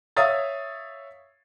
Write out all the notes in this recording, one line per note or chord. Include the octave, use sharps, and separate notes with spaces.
C#5 E5 F5 D#6 A6